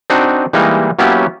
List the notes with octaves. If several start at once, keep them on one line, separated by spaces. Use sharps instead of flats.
C4 D4 D#4 F#4
E3 G3 G#3 A#3 D#4
F#3 A#3 B3 C#4 E4 G4